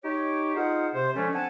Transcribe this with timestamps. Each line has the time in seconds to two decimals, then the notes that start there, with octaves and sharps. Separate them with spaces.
0.04 D#4 G4 C#5
0.55 D#4 F4 G#4 C5 F5 F#5
0.94 C3 C5
1.15 D3 F3 G#3 A3 C#4
1.33 C4 D4 F#5 G#5 A5